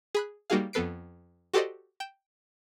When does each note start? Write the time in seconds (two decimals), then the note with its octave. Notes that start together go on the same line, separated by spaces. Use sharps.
0.15 G#4 B5 F#6
0.50 G3 A#3 D#4 F#4 G#4 F5
0.73 F2 B3 A4 B4 C7 D7
1.54 F#4 G4 A4 C5 D5 D#5
2.00 G5 G6 E7